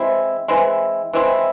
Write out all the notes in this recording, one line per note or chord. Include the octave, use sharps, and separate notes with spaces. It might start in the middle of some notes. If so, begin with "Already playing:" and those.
Already playing: E3 G#3 C4 E4
E3 G#3 C4 E4
E3 G#3 C4 E4